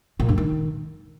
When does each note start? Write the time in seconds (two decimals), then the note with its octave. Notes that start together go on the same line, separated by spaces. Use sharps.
0.20 A#2
0.29 G2
0.38 D#3